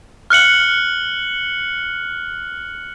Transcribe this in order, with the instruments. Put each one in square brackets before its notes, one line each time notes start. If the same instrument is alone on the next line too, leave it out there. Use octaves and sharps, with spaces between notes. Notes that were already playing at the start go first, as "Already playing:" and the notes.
[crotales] F6 F#6 C#7 F#7